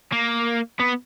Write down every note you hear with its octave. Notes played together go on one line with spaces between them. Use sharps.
A#3
B3